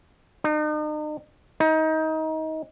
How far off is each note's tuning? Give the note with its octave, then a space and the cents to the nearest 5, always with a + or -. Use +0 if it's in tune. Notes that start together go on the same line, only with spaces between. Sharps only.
D#4 -40
D#4 +25